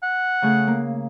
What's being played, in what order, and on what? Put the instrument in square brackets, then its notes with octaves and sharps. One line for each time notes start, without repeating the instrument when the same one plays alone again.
[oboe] F#5
[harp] C#3 A3 G#4
A#3